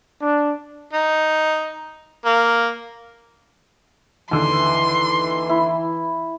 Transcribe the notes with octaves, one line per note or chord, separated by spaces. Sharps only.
D4
D#4
A#3
D#2 D3 E3 C6
E4